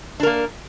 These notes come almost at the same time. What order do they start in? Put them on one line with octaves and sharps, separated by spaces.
D4 A#4 A#3